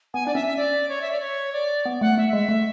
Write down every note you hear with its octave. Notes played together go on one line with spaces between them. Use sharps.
B3 G#5
D4 D5
C#4 E5
E5
D5
C#5
E5
D5
C#5
D5
B3
A3 F#5
A3 E5
G#3 E5
A3